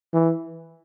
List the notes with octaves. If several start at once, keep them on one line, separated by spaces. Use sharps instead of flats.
E3